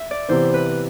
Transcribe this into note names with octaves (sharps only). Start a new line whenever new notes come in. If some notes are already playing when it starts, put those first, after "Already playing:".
Already playing: E5
D5
C3 E3 B3 C5
B4